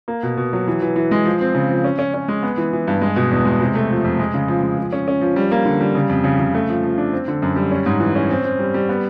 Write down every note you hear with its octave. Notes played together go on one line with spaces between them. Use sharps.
A#3
B2
B2
F#3
E3
E3
E3
G#3
F3
C4
C#3
F3
C#4
C#4
C#4
G#3
B3
E3
E3
G2
G#3
B2
E2
G#3
C3
A3
F3
F2
G#3
C#3
F3
G#3
F3
C#4
C#4
F3
G3
A#3
D3
G3
C#3
F2
C#3
C#3
A3
F3
F3
D4
C4
D3
F#2
G3
C#4
G#2
E3
C#4
C4
C4
G3
G3
B3